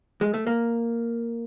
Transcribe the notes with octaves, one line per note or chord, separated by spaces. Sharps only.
G#3
A3
A#3